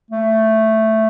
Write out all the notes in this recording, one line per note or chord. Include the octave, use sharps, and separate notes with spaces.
A3